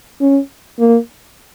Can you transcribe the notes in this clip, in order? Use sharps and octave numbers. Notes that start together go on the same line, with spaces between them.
C#4
A#3